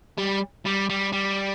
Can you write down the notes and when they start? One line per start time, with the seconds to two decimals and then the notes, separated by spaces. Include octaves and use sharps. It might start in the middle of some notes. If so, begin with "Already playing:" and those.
0.18 G3
0.65 G3
0.89 G3
1.13 G3